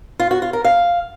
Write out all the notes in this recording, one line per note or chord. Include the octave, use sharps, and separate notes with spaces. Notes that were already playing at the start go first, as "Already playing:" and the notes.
F4
F#4
F4
A#4
F5